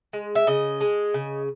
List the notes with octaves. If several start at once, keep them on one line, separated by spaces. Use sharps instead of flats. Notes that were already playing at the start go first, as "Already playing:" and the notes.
G#3
E5
C#3 D#5
G#3
C#3